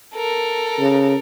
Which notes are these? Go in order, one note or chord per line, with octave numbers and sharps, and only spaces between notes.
A4 A#4
C#3